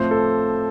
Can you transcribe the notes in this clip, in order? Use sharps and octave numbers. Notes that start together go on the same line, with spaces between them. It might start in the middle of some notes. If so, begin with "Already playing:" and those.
Already playing: A2 F3 C4 C5
A4